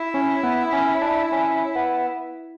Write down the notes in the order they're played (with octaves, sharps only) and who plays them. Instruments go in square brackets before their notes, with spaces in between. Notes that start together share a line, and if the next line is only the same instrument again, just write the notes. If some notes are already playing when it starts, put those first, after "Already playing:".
Already playing: [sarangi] E4
[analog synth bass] C#4
B3
C#4
D4
C#4
B3